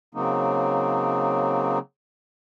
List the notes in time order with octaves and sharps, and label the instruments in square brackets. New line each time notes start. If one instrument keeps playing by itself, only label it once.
[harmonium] C#3 F#3 A#3 C4 D#4